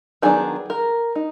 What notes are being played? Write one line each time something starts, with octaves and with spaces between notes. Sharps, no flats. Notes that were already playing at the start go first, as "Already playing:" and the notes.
D#3 F#3 B3 D4 G#4
A#4
D#4